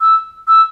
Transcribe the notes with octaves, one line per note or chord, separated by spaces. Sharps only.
E6
E6